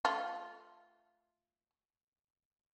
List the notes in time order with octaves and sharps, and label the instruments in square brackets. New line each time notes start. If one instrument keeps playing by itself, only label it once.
[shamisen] A3 F4